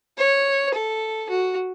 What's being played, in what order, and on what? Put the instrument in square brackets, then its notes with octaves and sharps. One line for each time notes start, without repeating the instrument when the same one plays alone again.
[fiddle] C#5
A4
F#4